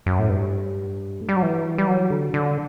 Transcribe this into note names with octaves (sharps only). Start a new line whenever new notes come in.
F#2
A2
G2
A3
G3
F#3
E3
G3
F#3
D3
D3